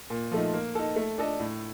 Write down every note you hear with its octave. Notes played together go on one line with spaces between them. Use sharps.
A#2
F3 A3 D#4
A#3
D#4 A4
A3
D4 A4 D#5
A2